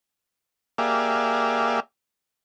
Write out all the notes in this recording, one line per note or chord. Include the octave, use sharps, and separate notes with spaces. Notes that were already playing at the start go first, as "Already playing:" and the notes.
A#3 G4 G#4 D5 E5 F5